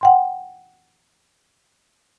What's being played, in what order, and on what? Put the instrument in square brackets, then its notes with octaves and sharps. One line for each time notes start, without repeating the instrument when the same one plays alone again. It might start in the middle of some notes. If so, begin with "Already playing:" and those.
[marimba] F#5 G5 C6